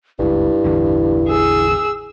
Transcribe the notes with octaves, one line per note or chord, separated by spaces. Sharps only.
F#1 C#2 G2 E4
A1 E2 D3
G#4 E6